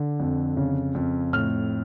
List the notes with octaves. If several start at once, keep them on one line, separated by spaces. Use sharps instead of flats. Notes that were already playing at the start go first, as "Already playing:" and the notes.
Already playing: D3
F2
C#3
F2
A2 F6